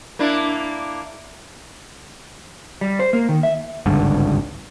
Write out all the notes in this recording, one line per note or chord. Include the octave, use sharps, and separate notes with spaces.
A#3 D4 E4
G3
C5
A#3
D#3
E5
G#1 C#2 G2 D3